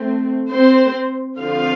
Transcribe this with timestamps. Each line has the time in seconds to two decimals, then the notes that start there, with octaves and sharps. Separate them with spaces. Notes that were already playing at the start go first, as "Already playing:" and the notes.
Already playing: A3 C4
0.51 C4 C5
1.39 D3 F3 C4 F4 F5